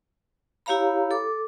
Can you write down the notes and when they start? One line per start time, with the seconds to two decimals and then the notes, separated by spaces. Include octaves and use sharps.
0.66 E4 G4 C#5 F5 A#5 B5
1.11 A4 D6